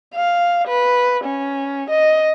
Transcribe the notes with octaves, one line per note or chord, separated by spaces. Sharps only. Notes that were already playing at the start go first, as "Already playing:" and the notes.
F5
B4
C#4
D#5